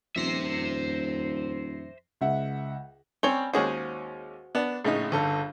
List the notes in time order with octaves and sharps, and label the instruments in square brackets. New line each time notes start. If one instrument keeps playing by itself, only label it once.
[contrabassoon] D#1 [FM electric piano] F2 A#6 C7 [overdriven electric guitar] C5 E5
[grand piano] C#2 E5 F#5
[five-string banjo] G3 C#4 C#5 [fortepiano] C4 [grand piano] G7
[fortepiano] D#2 G#3 C#4 [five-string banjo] F#4 G#4 C5
[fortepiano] B3 D4
[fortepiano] A#1 C#3 D#4 [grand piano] A2
[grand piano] G1 A4 F5